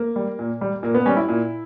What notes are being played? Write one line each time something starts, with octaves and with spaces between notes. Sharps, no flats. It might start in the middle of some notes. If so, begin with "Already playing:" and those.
Already playing: A#3
G3
A#2
G3
A#2 A#3
B3
G3 C#4
E4
A#2